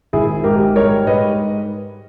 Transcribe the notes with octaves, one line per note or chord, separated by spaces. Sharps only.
G#1 E4 G#4
G#2 G4 A#4
G3 A#4 C#5
G#2 B4 D#5